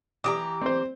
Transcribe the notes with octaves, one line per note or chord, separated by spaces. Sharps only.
E3 G4 A#5 D#6
C4 C5